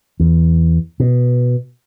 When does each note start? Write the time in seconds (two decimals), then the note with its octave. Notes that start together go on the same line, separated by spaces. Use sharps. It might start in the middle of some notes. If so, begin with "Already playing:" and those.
0.20 E2
1.00 B2